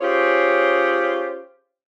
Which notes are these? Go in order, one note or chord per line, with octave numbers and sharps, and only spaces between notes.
C#4 F4 G4 G#4 C5 C#5